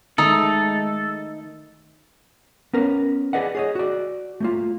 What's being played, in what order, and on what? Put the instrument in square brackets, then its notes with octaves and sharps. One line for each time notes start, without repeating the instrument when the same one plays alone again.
[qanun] D#3 A3 [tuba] G#3 [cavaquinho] D#4 [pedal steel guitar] A4
[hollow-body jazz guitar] B3 C#4 A#4 B4
G#4 B4 D5 D#5 F#5
G#4 C#5 D#5
F#4 D5
A3 A#3 F4